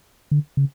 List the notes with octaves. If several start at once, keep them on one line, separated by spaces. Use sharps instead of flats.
D3
C#3